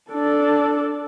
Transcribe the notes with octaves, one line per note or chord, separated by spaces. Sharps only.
D4 A4